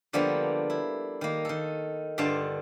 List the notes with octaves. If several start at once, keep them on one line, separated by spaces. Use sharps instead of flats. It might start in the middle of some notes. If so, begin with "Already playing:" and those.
D3 F3 G3 A#3 B3 D4
E4
D#3 A#3
D#3 A4
G2 D3 F4 F5 A5